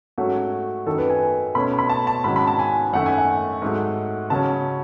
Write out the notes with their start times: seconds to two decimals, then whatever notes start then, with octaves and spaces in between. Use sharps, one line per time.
0.18 G#2 F#3 A3 C#4 F#4
0.86 F#2 D#3 F#3 A4
0.98 B4
1.10 G#5
1.55 B2 A3 C#4 B5
1.79 B5
1.89 A5
2.07 A5
2.24 G#2 D#3 F#3 C#4 B5
2.36 B5
2.47 A5
2.59 G#5
2.93 F#2 D#3 A3 F#5
3.06 G#5
3.18 F#5
3.62 G#2 F#3 A3
4.30 C#3 F#3 C#4 A5